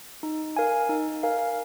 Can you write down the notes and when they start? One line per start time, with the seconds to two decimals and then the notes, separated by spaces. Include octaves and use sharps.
0.23 D#4
0.56 A#4 F5 G#5
0.89 D#4
1.23 A#4 F5 G#5